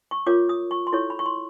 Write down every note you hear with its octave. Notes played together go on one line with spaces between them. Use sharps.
C#6
F4 A#4 C#5 D6
D#6
C#6
C6
E4 A4 C#5 C#6
B5
C#6
C6